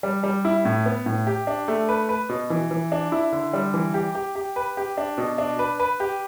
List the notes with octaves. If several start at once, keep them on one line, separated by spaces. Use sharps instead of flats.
G3
G3
E4
A2
B3
A2
G4
D4
A3
B4
B4
B2
E3
E3
D4
E4
D3
G3
E3
G4
G4
G4
B4
G4
D4
B2
D4
B4
B4
G4